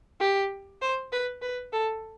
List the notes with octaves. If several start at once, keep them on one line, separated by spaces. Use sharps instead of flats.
G4
C5
B4
B4
A4